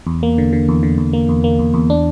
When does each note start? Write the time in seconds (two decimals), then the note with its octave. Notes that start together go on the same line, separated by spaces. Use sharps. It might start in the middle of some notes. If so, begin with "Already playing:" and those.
0.07 E2
0.23 A#3
0.38 D3
0.53 D3
0.69 E2
0.83 D3
0.98 E2
1.13 A#3
1.29 E2
1.44 A#3
1.59 E2
1.74 E2
1.90 D4